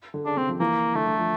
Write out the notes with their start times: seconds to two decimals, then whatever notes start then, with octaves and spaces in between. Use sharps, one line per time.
0.14 D3
0.25 C#3 D4
0.37 C3 C4
0.49 F3
0.60 E3 A#3
0.95 D3 A3
1.07 D3
1.18 F3